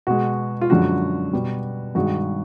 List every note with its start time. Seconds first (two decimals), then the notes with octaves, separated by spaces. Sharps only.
0.07 B2 G#3 F#4
0.61 F4
0.70 F#2 D3 F3 G#3 F#4
1.33 B2 G3
1.95 G2 D#3 G#3 F#4